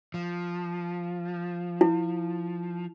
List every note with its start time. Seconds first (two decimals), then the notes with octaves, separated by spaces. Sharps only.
0.14 F3
1.81 E4